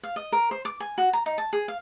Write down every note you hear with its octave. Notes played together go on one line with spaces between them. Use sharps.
F5
D#5
A#4
C5
D6
G#5
F#4
A#5
D#4
A5
G#4
F5